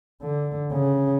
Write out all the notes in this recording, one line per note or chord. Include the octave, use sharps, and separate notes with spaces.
D3
C#3